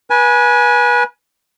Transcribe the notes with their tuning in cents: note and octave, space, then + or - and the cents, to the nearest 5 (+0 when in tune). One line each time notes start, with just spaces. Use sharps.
B4 -30 G#5 +10